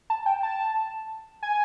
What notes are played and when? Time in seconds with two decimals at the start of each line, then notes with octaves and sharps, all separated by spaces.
0.10 A5
0.26 G5
0.43 A5
1.43 G#5